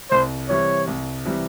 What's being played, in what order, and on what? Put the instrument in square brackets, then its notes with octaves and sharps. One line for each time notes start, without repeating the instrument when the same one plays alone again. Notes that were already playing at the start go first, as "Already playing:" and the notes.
[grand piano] C2 [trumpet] C5
[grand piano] C3 E3 G3 [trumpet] C#5
[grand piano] C2
C3 E3 G3